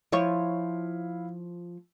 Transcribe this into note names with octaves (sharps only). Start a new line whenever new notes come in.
F3 E4 C#5 F5